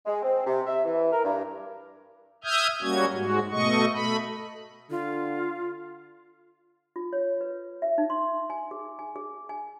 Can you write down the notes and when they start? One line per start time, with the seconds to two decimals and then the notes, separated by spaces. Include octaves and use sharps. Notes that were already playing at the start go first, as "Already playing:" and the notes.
0.06 G#3
0.23 C4
0.46 C3
0.67 E5
0.84 E3
1.12 A#4
1.25 G2
2.44 E5 D#6 F6 G6 G#6
2.82 G3 A#3 C#4 F#4 G#6
3.14 G#2 G#3 F#4
3.51 B2 A3 D#5 C#6
3.93 A3 B5
4.91 D3 F4
6.96 F4
7.13 C#5
7.41 B4
7.82 E5
7.98 D#4
8.10 C6
8.50 G#5
8.71 G#4
8.99 G#5
9.16 G#4
9.49 G#5